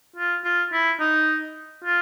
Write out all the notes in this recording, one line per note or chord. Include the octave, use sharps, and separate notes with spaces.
F4
F4
E4
D#4
F4